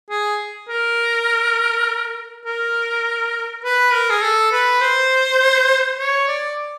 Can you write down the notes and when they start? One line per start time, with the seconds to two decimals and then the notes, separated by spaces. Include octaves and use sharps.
0.10 G#4
0.69 A#4
2.46 A#4
3.64 B4
3.93 A#4
4.10 G#4
4.22 A4
4.52 B4
4.81 C5
5.99 C#5
6.28 D5